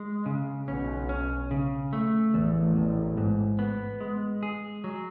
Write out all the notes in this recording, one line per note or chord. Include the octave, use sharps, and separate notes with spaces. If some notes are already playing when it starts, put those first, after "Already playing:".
Already playing: G#3
C#3
B1 B2 C#4
C#4
C#3
A3
A1 E2 A2
E2
G#2
B3
G#3
G#4
F#3